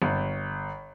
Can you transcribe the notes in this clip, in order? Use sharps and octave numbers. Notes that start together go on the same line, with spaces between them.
G1